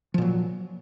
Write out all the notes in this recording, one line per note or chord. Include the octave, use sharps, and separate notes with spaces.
A#2 F3 F#3